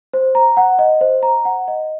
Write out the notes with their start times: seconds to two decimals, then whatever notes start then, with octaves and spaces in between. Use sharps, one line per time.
0.13 C5
0.35 A#5
0.57 F#5
0.79 D#5
1.01 C5
1.23 A#5
1.45 F#5
1.68 D#5